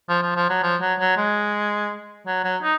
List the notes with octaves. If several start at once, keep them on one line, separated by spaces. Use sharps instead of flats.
F3
F3
F3
F#3
F3
F#3
F#3
G#3
F#3
F#3
D#4